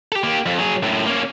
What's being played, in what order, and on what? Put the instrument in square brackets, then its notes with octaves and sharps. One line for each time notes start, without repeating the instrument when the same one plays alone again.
[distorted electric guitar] G4 A4
A#3 G4
F2
F#3 G#4
F#2 A2
A#3 C#4